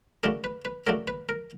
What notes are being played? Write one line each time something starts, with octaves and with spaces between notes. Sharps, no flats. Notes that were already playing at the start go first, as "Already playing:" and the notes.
C#3 F#3 A3 D4 A#4
B4
B4
C#3 F#3 A3 D4 A#4
B4
A#4